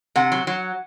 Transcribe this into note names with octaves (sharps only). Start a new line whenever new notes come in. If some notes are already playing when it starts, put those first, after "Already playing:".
C3 F#5
F#3
F#3